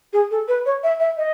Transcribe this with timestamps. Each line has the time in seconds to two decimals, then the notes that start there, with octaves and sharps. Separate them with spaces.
0.13 G#4
0.31 A4
0.48 B4
0.66 C#5
0.83 E5
1.00 E5
1.18 D#5